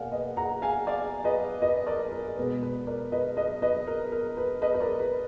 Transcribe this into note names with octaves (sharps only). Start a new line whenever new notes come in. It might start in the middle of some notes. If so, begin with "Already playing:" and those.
Already playing: B2 A#3 D5 F5 F#5 G#5
B4 D#5
F#5 A#5
F5 G#5
D5 F5
B4 D#5
B4 D#5
A#4 D5
A#4
B2 G#3 B3 B4
B4
A#4 D5
B4 D#5
B4 D#5
B4 D#5
A#4
A#4
B4
B4 D#5
B4
A#4 D5
B4